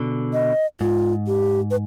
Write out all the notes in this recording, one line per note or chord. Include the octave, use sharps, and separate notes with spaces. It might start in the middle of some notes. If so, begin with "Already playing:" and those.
Already playing: B2 D3
D#5
G#2 F4
G4
B4